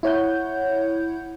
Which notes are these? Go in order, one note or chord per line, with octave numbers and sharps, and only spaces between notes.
E4 C#5 F#5 G6